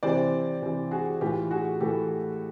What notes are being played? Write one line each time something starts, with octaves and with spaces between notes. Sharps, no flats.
C3 E3 C5 D5
C3 E3
F#4 G#4
A2 E3 F4 G4
F#4 G#4
A2 E3 G4 A4